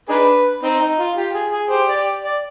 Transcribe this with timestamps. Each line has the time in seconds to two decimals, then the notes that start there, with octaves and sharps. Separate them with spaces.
0.09 D4 D#4 G#4 B4
0.63 C4 D#4
0.81 D#4
0.98 F4
1.16 F4 G4
1.34 G#4
1.52 G#4
1.70 G4 C5
1.89 D5
2.24 D5